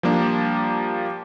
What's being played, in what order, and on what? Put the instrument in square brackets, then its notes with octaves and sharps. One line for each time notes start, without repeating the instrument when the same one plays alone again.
[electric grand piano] F3 G3 A#3 D4